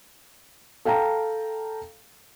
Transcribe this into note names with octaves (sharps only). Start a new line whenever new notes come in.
A4 F5 G5 A5 A#5